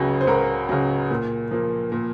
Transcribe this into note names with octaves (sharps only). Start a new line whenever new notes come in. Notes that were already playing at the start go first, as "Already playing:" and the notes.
Already playing: C#2 C#3 F#3
C5
C#2 F#4 A#4
C#3 F#3
A#2
F3 A#3
A#2